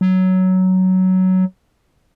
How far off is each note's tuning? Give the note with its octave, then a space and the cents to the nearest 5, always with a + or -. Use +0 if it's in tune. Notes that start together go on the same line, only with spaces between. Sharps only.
F#3 +10